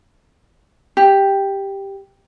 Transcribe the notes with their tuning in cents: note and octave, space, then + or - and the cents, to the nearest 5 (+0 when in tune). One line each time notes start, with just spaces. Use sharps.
G4 +5